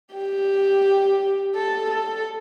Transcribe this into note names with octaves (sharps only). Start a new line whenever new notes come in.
G4
A4
A4